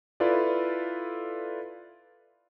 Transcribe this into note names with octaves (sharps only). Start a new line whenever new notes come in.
E4 F4 A4 B4 D5